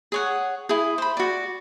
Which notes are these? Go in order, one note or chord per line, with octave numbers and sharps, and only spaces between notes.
G#4 C#5 F#5
E4 G#4
C5 B5
F#4 D5